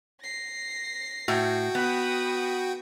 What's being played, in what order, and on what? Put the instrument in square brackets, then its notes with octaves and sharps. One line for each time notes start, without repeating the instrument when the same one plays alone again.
[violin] A#6 C7
[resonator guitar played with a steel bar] A2 [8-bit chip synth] F#4 G5
[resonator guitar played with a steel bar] B3 [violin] B5 D#6